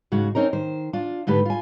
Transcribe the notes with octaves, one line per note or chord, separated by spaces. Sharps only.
G#2 C#3 F#4
C4 C#4 D#4 A#4
D#3 C5
D4 F4
G#2 D3 A3 G4 B4
F4 G#5